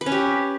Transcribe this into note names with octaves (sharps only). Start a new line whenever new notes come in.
B4
C#4
G4